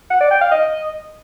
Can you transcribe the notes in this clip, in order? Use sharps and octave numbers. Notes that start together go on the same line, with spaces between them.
F#5
D5
G5
F5
D#5